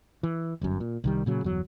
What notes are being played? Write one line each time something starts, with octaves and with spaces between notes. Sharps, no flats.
E3
G1 F#2
A#2
C2 D#3 G3
A#2 C#3 F#3
G1 E2 F#3